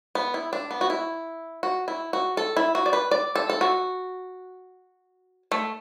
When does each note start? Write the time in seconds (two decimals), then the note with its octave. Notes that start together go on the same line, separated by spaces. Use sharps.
0.15 B3
0.34 E4
0.53 D4
0.71 B3
0.81 F#4
0.90 E4
1.63 F#4
1.88 E4
2.13 F#4
2.37 A4
2.57 E4
2.75 F#4
2.86 D5
2.93 B4
3.11 D5
3.35 A4
3.50 A4
3.61 F#4
5.52 A3